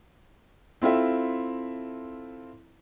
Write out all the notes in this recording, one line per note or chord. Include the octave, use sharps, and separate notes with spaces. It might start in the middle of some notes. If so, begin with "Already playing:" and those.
C4 E4 F4 A4 E5